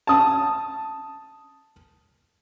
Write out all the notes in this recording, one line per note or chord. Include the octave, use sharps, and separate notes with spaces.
A5 D#6